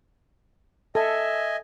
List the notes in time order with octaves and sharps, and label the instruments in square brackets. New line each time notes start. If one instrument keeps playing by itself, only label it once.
[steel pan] A4 [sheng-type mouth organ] D#5 G#5 [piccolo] E5